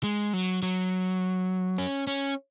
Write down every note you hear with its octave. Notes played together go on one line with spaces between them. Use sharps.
G#3
F#3
F#3
C#4
C#4